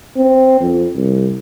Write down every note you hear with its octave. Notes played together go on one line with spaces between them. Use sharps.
C4
F2
C2